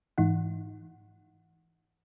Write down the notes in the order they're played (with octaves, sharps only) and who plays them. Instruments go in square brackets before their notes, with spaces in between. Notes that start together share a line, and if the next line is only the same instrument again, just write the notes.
[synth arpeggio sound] G#2 E3 D#4 F#5